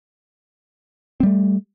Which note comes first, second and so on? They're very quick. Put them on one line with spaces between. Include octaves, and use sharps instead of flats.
C4 G3 A3